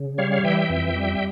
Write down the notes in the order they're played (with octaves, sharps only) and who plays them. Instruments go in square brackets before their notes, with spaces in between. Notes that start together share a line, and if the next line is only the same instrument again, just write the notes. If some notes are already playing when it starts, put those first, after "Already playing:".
Already playing: [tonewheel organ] C#3
G3 C#5 F5
F5
E3 E5 G5
F2
G3